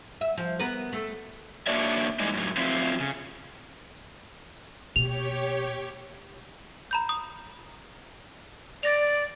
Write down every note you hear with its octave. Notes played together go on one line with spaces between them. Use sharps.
E5
F3
B3 A#4 B4
A3
A#3 D4 F#4 C#5 D5 E5
E3 G3 G#3 D#4
F#2 A2 F#3
F3 F#3 A3 C4 E4 F4
C#3
B2 A#3 G4 C#5 F7
A#5 B5 G6
D#6
D5 A6 A#6 F7